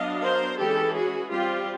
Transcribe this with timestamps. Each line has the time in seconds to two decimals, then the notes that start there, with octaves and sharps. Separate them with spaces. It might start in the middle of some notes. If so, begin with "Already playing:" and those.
Already playing: F#3 B3 D4 D#5 F5
0.22 A#4 C5
0.58 E3 G#3 C#4 G4 A4
0.94 F#4 G#4
1.30 G3 C4 F4 G4